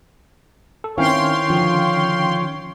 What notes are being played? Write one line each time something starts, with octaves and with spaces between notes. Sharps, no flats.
A4
D#3 C4 C#4 E4 C#5 F5 G5 C6
D3 F3